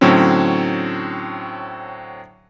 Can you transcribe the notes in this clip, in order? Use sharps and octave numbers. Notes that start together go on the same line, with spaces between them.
A2 D3 F#3 C4 C#4